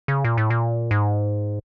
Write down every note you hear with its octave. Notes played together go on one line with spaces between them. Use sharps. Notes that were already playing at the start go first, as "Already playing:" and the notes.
C#3
A#2
A2
A#2
G#2